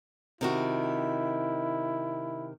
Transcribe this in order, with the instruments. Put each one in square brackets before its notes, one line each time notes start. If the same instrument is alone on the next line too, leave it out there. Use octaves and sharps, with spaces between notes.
[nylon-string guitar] C3 D#3 F#4 [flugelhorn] E4